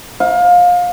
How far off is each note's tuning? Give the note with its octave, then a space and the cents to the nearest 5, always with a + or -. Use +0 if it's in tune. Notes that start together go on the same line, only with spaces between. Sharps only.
F5 +25